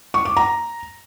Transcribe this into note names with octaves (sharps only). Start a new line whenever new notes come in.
C#6
D6
A#5